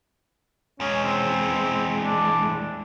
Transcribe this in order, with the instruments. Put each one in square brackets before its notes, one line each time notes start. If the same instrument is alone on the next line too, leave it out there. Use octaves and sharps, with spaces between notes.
[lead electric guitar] E2 G#3 [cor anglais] C#4
[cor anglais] C4
D4